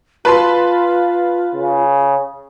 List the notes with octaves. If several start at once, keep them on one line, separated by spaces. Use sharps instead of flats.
F4 B4 A5 C6
C#3